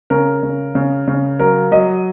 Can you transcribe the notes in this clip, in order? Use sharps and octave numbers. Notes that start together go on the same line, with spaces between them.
C#3 A#4
C#3
C#3
C#3
F#3 A#4
F#3 D#5